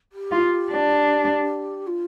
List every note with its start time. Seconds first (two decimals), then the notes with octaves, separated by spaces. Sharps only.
0.12 G4
0.32 F4
0.71 D4
1.87 F4